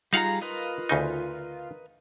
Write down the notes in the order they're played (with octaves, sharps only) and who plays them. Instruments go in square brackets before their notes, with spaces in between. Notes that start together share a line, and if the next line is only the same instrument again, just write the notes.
[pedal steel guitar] G3 G#4 A#5 [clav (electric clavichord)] D#4 F5 F#5 [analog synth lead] F4
[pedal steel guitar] A#4 B4 D#5
[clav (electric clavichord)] D2 C#3 D#4